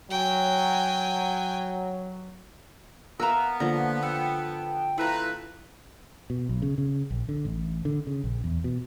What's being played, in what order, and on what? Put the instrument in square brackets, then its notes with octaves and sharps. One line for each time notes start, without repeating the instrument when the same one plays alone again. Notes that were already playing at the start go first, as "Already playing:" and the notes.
[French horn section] F#3 [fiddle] G5 G#5
[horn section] B3 [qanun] A#4 B4 E5 [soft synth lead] F5 [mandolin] A#5 E6
[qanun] D3 F3 [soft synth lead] A#3 [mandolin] A#5
[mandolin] A4 [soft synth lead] G5
[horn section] A3 F4 B4 [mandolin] C4 A#5 [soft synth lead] E4
[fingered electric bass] B2
B1
C#3
C#3
A#1
D3
A1
D3
C#3
A#1
E2
B2